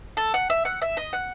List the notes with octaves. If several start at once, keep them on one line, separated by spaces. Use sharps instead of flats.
A4
F#5
E5
F#5
E5
D#5
F#5